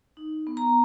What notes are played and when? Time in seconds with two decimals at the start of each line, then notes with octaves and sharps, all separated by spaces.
0.17 D#4
0.47 B3
0.57 A#5